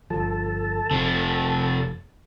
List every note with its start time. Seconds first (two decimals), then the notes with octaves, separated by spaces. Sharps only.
0.10 G1 F3 A4 A5
0.91 F1 C3 F3